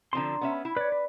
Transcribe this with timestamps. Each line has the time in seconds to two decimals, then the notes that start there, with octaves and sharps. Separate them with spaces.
0.13 D3 F3 C4 A#5 C6
0.41 B3 C#4 E5
0.65 E4
0.77 B4 C#5 D5
0.92 B4